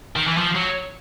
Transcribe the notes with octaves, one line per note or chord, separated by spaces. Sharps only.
D#3
E3
F3
F#3